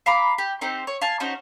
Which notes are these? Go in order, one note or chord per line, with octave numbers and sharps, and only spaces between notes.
F5 A#5 B5 D6
G4
C4 D#4 G4 C5
C#5
F5 G#5 A5
C#4 D#4 F#4 C5